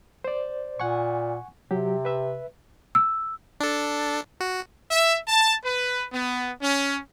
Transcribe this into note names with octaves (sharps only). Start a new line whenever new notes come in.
C5 D5
A#2 F#5 G#5 C#6
C3 F#3 G4
B4 E5
E6
D4 A4
F#4
E5
A5
B4
B3
C#4